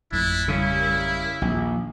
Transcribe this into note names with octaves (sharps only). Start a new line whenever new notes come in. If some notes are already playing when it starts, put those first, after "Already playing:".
G#1 F2 A2 D4 E4
C#3 G3 E4 A#4 F5
A#1 D#2